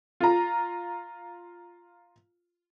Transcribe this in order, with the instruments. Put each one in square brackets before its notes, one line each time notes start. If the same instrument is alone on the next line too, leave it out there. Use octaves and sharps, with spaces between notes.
[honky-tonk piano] F4 A#5